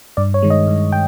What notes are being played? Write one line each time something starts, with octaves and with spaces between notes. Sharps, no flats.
G2 D5
C#5
D#3 G#3
D#5
G2
G5